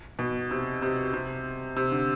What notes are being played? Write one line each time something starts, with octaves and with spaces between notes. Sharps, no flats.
B2
C3
C3
C3
C3
D3